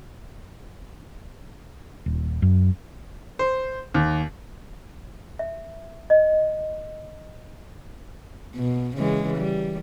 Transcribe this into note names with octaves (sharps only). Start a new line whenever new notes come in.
D#1
F#2
C5
D#2
E5
D#5
B2
C#3 E3 G#3
G3